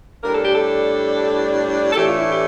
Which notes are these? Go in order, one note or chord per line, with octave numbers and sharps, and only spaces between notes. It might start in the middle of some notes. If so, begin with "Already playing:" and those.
A2 G3 D4 A#4
A4
G4
A4
A4
A2 E3 A3 D4 G4
F4
E4
G4